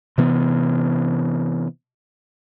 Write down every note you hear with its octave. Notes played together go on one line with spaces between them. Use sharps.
C3 E3 B3